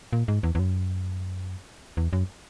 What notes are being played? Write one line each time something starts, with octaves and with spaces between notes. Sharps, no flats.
A#2
G#2
E2
E2
F#2
E2
F#2